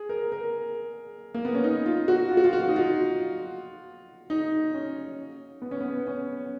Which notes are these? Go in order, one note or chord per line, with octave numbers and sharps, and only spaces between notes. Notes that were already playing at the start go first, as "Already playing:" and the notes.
Already playing: G#4
A#4
A#4
A#3
B3
C#4
D#4
F4
F#4
F4
F#4
F4
F#4
F4
D#4
F4
D#4
C#4
B3
C#4
B3
C#4